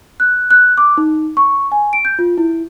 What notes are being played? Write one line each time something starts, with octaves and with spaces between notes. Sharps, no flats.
F#6
F#6
D6
D#4
C#6
G#5
D7
G6
F4
E4